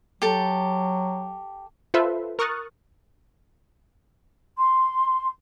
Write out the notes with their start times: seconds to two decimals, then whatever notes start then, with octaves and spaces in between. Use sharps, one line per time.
0.22 F#3 G4 A4
1.94 F4 A4 B4 C5 E5 C6
2.39 A#4 C#6 D#6 F6 F#6 A6
4.56 C6